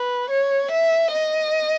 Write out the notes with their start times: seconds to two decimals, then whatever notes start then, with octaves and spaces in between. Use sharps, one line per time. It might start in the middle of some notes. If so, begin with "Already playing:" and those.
Already playing: B4
0.30 C#5
0.71 E5
1.12 D#5